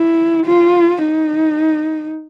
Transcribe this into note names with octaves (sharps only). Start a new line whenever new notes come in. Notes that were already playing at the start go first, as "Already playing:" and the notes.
Already playing: E4
F4
D#4